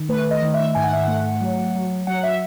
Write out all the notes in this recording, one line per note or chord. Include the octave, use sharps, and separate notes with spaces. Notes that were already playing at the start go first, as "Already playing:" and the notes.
Already playing: D#3
A3 B4
D#5
D#3
E5
G#2 G#5
F#5
E5
F#5
A3
F#3
F#3
F#3 F#5
E5